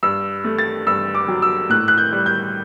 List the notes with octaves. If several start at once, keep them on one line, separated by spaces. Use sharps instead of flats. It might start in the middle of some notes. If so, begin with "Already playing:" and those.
G2 E6
A3
A6
G2 E6
D6
F#3
E6
A2 F#6
F#6
G6
G3
G6